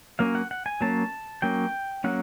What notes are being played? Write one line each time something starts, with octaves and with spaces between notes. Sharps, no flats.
F#3 A#3 C#4 F5
F#5
F#5
G#5
F#3 A#3 C#4 A5
F#3 A#3 C#4 G5
F#3 A#3 C#4 F#5